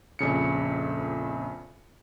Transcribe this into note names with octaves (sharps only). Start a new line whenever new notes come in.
A#1 F2 C#3 C#7